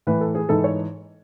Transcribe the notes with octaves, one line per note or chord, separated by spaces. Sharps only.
A2 E3 B4
A4
G#4
G#2 E3 A4
C#5